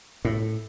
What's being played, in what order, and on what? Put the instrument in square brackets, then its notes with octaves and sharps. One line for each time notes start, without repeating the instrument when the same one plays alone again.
[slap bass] A2